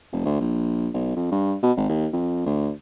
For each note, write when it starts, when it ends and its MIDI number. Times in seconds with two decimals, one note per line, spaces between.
0.12 0.24 29
0.25 0.37 38
0.40 0.89 34
0.94 1.12 35
1.16 1.26 41
1.31 1.55 43
1.63 1.72 47
1.77 1.87 32
1.89 2.07 39
2.13 2.42 41
2.46 2.70 38